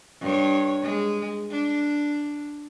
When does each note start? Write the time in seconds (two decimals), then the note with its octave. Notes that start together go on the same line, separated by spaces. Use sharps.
0.21 G2 C#5
0.83 G#3
1.51 D4